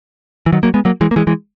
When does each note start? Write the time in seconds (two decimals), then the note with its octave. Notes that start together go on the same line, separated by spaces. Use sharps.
0.46 E3
0.52 D#3 F#3
0.63 F#3 A#3
0.74 G#3 B3
0.85 F#3 A#3
1.01 E3 G#3
1.11 A#3
1.16 E3 G#3
1.27 E3 G#3